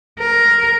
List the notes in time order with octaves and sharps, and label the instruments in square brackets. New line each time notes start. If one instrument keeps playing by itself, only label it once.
[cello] A#4